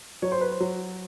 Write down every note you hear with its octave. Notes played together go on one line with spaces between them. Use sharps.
F#3 C#5
C5
B4
C5
F#3